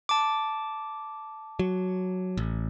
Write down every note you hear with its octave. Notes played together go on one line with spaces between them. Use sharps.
A5 D6
F#3
A1